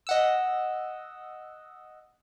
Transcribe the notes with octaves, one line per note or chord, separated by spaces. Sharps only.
D#5 F#5 E6